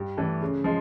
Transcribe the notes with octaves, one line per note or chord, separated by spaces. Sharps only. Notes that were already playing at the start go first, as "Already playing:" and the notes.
Already playing: G2
E3 A3 D4
C#3
F3 G#3